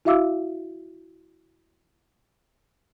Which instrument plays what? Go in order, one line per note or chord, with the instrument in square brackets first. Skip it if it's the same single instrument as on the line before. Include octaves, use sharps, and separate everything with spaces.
[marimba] E4 F#4 E5 F5 D6 E6